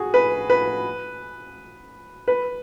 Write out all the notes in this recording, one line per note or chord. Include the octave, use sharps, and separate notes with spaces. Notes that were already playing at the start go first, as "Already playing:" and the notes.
Already playing: F#4 G#4
B4
B4
B4